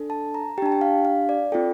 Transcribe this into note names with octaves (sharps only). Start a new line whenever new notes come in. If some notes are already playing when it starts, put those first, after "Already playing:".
Already playing: D4 A4
A5
A#5
D4 G4 G5 A5
G5
F5
F5
D5
C4 F4 A4 G5